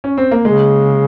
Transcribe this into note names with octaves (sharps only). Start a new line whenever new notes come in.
C#4
C4
A#3
C#3 G#3